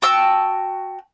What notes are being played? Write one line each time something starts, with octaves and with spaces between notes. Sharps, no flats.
F#4 G5 A5 E6